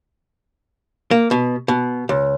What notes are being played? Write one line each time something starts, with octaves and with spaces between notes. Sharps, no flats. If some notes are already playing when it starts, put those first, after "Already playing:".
A#3
B2
B2
C#2